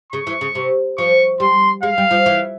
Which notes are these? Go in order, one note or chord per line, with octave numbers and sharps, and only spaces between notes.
C#3 C#6
E3
C#3
C3
F3 C#6
G3 C6
G#3 F5
G3
F3
E3